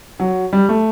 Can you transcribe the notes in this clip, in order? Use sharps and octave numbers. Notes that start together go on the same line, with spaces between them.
F#3
G3
A3